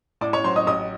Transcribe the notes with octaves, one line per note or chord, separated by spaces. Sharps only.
A2 D5 D6
C#5 C#6
F#3 C5 C6
D#5 D#6
A1 D#5 D#6